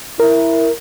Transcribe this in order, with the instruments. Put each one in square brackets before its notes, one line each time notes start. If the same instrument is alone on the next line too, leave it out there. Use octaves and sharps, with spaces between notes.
[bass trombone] E4 [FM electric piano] A#4